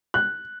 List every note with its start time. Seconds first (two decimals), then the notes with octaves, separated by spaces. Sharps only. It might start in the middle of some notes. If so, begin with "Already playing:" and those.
0.14 F#6